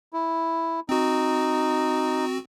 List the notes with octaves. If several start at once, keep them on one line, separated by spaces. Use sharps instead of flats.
E4
C4 D#4 F#4